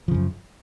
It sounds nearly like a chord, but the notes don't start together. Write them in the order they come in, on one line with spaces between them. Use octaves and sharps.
F3 C#3 F#2